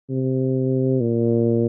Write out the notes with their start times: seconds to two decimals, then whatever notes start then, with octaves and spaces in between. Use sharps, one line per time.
0.10 C3
1.01 A#2